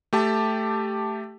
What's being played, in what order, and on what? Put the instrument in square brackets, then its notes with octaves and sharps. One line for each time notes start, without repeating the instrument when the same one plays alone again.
[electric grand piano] A3 G4 A5